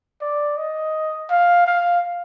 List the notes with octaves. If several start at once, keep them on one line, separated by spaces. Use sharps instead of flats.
D5
D#5
F5
F5